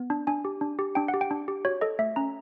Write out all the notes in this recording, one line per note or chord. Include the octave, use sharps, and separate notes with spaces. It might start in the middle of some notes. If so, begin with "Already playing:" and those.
Already playing: B3
D4
D4 G#5
G4
D4
G4
D4 G5
F#5
G4
G5
D4
G4
F#4 C#5
A4 D#5
A3 E5
C#4 A#5